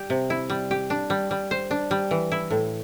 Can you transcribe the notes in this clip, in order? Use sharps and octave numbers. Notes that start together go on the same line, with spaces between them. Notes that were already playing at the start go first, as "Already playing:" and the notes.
Already playing: G3 G4
C3
E4
G3
G4
D4
G3
G3
C5
D4
G3
E3
E4
A2